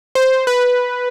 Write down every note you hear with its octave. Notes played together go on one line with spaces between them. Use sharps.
C5
B4